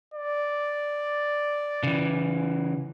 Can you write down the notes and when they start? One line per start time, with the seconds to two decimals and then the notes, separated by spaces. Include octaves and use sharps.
0.14 D5
1.83 C#3 E3